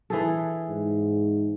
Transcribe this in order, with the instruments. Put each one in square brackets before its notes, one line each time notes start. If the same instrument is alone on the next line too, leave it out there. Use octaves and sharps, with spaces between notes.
[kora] E3 G#4 A4
[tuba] G#2